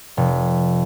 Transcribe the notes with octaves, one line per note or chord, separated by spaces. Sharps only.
F1